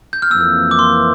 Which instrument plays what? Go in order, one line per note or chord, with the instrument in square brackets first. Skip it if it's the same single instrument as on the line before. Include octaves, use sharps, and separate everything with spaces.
[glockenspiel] G6
F6
[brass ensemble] F2 E3 A#3 [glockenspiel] E6
[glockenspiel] D6
C6